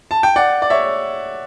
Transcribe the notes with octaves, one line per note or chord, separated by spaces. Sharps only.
A5
G5
D5 F#5
D5
C#5 E5